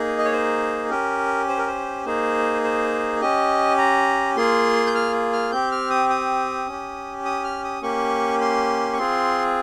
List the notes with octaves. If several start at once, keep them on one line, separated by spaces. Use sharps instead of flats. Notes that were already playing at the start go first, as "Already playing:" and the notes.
Already playing: A#3 D#4 G#4
D#5
C#5
C5
C#4 G4 A#4
C5
A#4
C5
A#3 D#4 G#4 C5
C5
C#4 G4 D#5
A#5
A#3 F4 G#4 C6
G6
F6
F6
C4 G4 G6
F6
D#6
D#6
C#4 G4
D#6
F6
D#6
A#3 C#4 G4 C#6
C6
C#6
C4 F4 G#4 C6